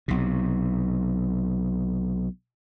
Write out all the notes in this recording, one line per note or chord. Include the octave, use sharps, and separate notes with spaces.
B1 C3